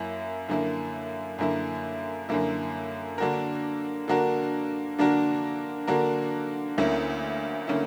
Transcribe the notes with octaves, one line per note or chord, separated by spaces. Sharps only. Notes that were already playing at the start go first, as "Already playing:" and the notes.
Already playing: F#2 A#3 E4
F#2 D3 A#3 E4
F#2 D3 A#3 E4
F#2 D3 A#3 E4
D3 A#3 D4 F#4 A#4
D3 A#3 D4 F#4 A#4
D3 A#3 D4 F#4 A#4
D3 A#3 D4 F#4 A#4
D2 D3 A#3 C#4 E4
D3 A#3 C#4 E4